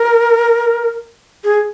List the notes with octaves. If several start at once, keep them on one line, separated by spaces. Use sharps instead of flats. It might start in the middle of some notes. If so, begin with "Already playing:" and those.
Already playing: A#4
G#4